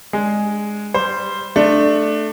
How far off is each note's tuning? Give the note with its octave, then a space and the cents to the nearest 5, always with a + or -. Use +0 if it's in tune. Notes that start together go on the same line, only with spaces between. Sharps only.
G#3 +0 D4 +0
G3 +0 C5 +0
A3 +0 D4 +20